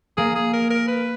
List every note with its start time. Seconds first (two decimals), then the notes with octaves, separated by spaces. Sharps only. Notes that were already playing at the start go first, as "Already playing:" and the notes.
0.17 A#3 G#4
0.35 G#4
0.53 A#4
0.70 A#4
0.88 B4